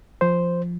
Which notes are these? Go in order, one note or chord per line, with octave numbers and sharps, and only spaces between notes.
F3 C5